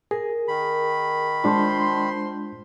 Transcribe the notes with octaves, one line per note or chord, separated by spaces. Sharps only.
G#4 A#4
D#3 B5
G#3 D4 F4 C5 A5 C6